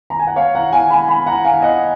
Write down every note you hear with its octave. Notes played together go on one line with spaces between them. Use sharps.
A#5
G#5
F#5
C#5 F5
F#5 A#5
F5 G#5
G#5 B5
G#5 B5
F#5 A#5
F5 G#5
D#5 F#5